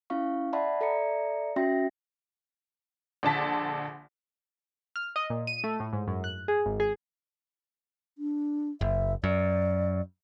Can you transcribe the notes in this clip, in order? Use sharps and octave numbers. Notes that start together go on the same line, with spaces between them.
C#4 E4 F5 C#6
D5 E5 F#5 A5 B5 C6
A4 D5 E5 A#5 C#7
C#4 F#4 E5 G5 C6 A#6
A#1 D3 A5 B6
F6
D#5
A#2
D#7
A3
A2
G#2
F#2
F#6
G#4
G#1
G#4
D4
F#1 E5
F#2 D5